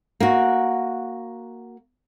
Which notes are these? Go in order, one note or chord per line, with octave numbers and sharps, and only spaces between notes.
A#3 F#4